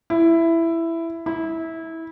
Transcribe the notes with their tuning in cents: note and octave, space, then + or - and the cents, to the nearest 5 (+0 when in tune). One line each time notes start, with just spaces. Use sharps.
E4 +10
E4 -20